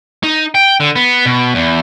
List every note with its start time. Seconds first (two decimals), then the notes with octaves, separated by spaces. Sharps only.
0.23 D#4
0.55 G5
0.80 D3
0.96 B3
1.26 B2
1.55 E2